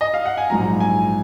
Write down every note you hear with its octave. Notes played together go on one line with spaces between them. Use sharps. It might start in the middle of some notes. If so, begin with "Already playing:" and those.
D#5
F5
F#5
G#5
A#1 G#2 F#3 A#5
G#5